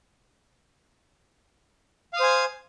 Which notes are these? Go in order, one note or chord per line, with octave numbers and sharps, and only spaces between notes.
C5 F5 G#5 D#6